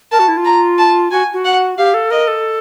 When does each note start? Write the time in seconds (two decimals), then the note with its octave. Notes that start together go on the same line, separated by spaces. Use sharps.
0.12 A#4 A5
0.19 F#4
0.28 E4
0.37 F4
0.45 A#5
0.78 A5
1.11 F#4 G#5
1.34 F#4
1.45 F#5
1.78 G4 F5
1.94 A4
2.10 A#4 D#5
2.28 A4